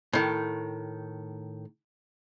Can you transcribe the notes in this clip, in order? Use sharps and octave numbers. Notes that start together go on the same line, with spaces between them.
A2 D#3